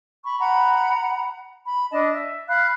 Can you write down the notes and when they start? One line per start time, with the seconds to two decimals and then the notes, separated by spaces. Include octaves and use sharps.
0.24 B5 C#6
0.39 F#5 A#5 B5
1.64 B5
1.90 D4 D#5 A5
2.12 E5
2.48 F5 B5 F#6